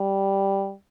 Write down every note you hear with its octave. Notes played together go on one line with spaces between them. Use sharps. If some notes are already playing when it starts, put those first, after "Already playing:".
Already playing: G3